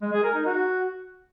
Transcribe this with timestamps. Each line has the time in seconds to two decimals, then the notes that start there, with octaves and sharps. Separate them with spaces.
0.02 G#3
0.13 G#4
0.24 A#4
0.35 D#4
0.45 F#4